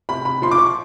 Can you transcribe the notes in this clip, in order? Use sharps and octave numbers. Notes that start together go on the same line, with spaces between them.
C3 B5
B5
F3 C6
D6
C#6